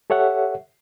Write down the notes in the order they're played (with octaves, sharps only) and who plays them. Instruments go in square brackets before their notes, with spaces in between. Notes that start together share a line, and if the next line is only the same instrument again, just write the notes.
[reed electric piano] G4 A4 C#5 E5 F#5